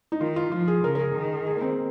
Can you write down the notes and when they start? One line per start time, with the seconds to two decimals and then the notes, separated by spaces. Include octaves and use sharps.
0.12 D#4
0.21 D#3 F4
0.36 F4
0.52 F3 F4
0.68 G#4
0.84 C#3 A#4
0.95 A#4
1.00 G#4
1.15 D#3
1.47 G#4
1.57 A#3
1.62 C4